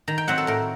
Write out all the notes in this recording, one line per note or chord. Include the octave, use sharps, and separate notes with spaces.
D#3 A#5
G5
F#3 C4 D#4 F#5
A4
A2 A#4